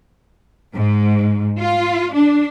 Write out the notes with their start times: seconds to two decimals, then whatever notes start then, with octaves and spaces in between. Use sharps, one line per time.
0.74 G#2
1.59 F4
2.14 D4